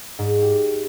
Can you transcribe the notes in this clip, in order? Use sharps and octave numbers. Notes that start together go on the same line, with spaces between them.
G#2
G4